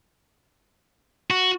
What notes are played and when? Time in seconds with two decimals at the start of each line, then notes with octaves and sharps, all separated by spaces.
1.30 F#4